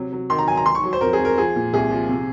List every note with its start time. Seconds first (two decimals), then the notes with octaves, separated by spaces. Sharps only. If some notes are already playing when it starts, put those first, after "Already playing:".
Already playing: C3 F#3
0.13 F#3
0.30 D#3 C6
0.39 A#5
0.48 F#3 G#5
0.57 A#5
0.66 F#3 C6
0.75 C#6
0.84 F#3
0.93 C5
1.01 F2 A#4
1.13 G#4
1.19 F2
1.25 A#4
1.37 F3 G#4
1.56 A#2
1.74 C2 G#4
1.91 F3
2.09 C3